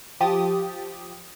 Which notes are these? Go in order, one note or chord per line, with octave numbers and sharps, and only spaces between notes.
F3 G4 D#6 A6